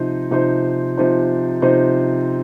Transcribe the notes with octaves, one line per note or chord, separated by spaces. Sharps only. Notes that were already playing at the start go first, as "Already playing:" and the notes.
Already playing: C3 F3 D#4 C5
C3 F3 D#4 C5
C3 F3 D#4 C5
C3 F3 D#4 C5